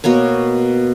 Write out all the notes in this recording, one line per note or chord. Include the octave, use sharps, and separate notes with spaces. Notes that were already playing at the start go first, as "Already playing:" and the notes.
B2 A#3 B3 C#5